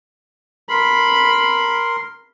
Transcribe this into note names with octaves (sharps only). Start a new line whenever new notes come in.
A#4 B5 C6